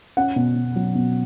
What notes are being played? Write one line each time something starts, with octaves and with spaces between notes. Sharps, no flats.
C#4 F#5
B2
B2
F#3
B2